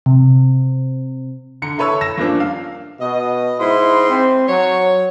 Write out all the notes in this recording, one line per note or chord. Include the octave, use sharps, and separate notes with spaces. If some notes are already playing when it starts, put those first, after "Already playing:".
C3
D3 A#5 C#7
E4 A4 B4 C#5 B5 E6
E6 A#6 E7
G2 F3 A#3 C#4 D4
F5
B2 D#5
G#2 E4 C6
C4
F#3 C#5